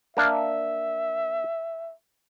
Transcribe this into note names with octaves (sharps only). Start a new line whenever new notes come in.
A#3 D4 E5 F5